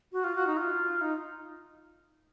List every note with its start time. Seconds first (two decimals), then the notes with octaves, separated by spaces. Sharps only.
0.13 F#4
0.24 F4
0.35 F#4
0.47 D#4
0.57 F4
1.01 D#4